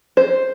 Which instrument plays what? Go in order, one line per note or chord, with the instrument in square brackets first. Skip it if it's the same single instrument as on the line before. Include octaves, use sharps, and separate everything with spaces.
[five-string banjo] C5